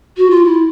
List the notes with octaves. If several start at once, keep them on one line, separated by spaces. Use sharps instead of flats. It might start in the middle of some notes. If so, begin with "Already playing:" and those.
F#4
F4
E4